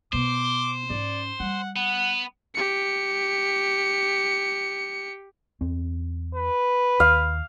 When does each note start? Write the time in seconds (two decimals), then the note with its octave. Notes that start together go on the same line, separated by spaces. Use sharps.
0.13 B2 B3 C5 D6
0.90 G#2 C#4 D5
1.40 G3 F#5
1.76 B3 F#5
2.54 G4 C#7
5.61 E2 C4
6.35 B4
7.00 D#2 F5